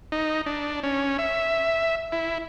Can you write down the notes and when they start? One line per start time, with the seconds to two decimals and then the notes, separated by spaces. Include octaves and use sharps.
0.12 D#4
0.46 D4
0.83 C#4
1.18 E5
2.12 E4